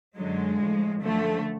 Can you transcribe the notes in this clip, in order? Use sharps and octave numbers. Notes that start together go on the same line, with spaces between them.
F#2 D3 F#3 G#3
A2 F3
F#2 D3 F3 A3